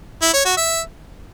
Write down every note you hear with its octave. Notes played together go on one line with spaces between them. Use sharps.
E4
C#5
F#4
E5